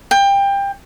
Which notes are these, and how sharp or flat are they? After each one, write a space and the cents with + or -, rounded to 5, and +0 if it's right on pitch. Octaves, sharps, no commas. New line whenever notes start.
G5 +20